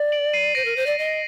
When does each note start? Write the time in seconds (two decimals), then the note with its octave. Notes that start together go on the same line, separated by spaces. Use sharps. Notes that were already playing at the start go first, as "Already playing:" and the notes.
Already playing: D5
0.12 D7 F#7
0.33 C7 D#7
0.55 C5 A#6 D7
0.65 A#4
0.76 C5
0.86 D5
0.98 D#5